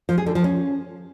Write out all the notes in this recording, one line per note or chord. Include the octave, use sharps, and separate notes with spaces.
F3
G#4
D3
F3
C#4